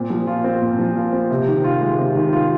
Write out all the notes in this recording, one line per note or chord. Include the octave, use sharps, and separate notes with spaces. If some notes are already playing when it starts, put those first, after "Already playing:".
Already playing: A#2 C4
F3
F4
C4
A#2
F3
F4
C4
C3
D#3
F4
G#3
C3
D#3
F4